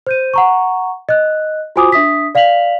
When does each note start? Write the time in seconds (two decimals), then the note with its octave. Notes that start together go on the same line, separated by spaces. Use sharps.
0.07 C5 G6 D#7
0.34 F#5 A#5 C#6
1.09 D#5 F#6
1.76 F4 F#4 C5 G#5 D6 D#6
1.92 D4 E5 D#6 B6
2.35 D5 F5 B6 F7 F#7